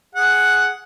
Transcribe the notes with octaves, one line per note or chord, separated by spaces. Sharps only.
G#4 F#5